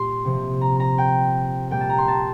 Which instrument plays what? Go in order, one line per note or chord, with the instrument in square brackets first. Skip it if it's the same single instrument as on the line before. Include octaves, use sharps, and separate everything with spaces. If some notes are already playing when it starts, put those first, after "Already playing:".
Already playing: [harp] A#2 G3 C6
C3 F3
A#5
A#5
G5
A#2 G3 G5
A5
A#5
C6
A5